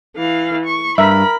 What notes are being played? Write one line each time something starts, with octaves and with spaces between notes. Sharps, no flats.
E3 F5
C#6
G2 A#4 E5 B5